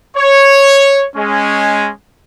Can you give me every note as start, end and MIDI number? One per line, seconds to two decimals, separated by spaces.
0.17 1.05 73
1.16 1.90 56
1.16 1.90 61